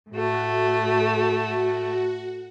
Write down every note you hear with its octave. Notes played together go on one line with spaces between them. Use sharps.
A2 A3 F#4